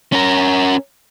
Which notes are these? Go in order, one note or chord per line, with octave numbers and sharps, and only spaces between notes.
C#4 A#4